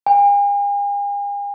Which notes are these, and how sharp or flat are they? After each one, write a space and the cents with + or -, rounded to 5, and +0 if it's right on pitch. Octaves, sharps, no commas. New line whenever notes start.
G#5 -45